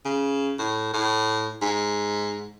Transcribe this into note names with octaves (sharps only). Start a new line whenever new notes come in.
C#3
A2
A2
G#2